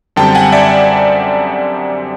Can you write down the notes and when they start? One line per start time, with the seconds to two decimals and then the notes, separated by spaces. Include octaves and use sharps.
0.16 F#2 D3 G3 C4 G5 A5
0.35 F#5 G#5
0.52 D5 E5